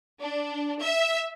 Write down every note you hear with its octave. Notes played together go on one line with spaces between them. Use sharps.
D4
E5